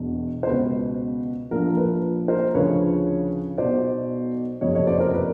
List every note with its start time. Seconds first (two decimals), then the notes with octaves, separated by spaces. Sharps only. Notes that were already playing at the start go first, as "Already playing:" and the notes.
Already playing: E1 E2 B2
0.43 C5
0.47 C#2 B2 B4
1.51 A#1 A#2 F3 A#4
1.77 B4
2.28 A#4 C5
2.55 D2 C#3 F3 B4 C#5
3.58 B1 B2 C5 D5
4.61 F#1 F2 C3 C#5 D#5
4.75 C#5 D#5
4.87 C5 D5
5.00 A#4 C5
5.14 B4